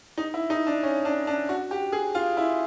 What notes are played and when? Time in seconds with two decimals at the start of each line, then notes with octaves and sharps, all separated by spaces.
0.18 D#4
0.34 E4
0.50 D#4
0.67 D4
0.83 C#4
1.05 D4
1.27 D4
1.49 F#4
1.71 G4
1.92 G#4
2.15 F4
2.37 E4